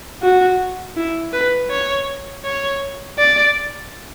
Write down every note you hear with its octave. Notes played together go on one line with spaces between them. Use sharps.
F#4
E4
B4
C#5
C#5
D5